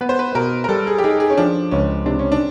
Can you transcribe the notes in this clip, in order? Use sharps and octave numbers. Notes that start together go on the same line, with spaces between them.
B3 B4
C5
B4
B2 A#4
A#4
G3 A4
G#4
G4
D#4 G#4
G#4
C#4
F3 D4
C#2 C#4
C3 D4
C#4
D4